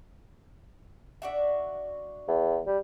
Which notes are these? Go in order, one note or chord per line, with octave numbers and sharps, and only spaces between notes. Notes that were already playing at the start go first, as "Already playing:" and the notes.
D4 F#4 E5
E2
G3